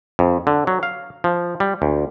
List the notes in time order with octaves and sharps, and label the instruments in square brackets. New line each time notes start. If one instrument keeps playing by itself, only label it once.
[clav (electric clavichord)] F2
D3
F#3
F5
F3
G3
D2